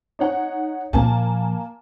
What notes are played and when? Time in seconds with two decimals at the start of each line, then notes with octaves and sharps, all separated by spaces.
0.19 D#4 C#5 F#5
0.93 A#2 F3 A#3 G#5 A5